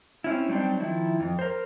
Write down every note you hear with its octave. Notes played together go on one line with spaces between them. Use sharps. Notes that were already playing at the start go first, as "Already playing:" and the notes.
C4 C#4 E4
F#3 G3 C4 D4 D#4
D#3 F3 E4
F2
A#4 C5